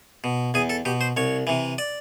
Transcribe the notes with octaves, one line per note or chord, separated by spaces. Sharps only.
B2
E2 G#4
A4
B2 G4
C5
C2 C#5
C3 E3
D5